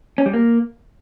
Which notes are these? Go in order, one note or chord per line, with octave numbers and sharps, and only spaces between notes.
C#4
G3
A#3